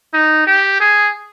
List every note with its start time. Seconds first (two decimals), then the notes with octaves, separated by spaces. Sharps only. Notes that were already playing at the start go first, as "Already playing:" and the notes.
0.13 D#4
0.47 G4
0.80 G#4